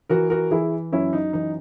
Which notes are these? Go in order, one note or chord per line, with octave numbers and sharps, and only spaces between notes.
E3 F#4 A#4
F#4 A#4
E3 E4 G#4
F#2 C#4 E4
D#4
E3 D#4